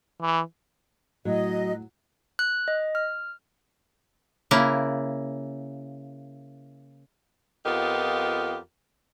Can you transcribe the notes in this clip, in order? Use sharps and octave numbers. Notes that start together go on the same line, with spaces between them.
E3
A2 F#3 D#5
F#6
D#5
F6
C#3 A#3 E4
F2 B3 F4 G4 A#4 D#5